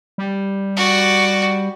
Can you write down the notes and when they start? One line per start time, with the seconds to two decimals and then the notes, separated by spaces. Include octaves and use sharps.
0.18 G3
0.77 F#4 D5